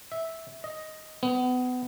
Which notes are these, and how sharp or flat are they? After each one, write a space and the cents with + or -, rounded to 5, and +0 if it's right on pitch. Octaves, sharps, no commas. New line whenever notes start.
E5 -10
D#5 +5
B3 +25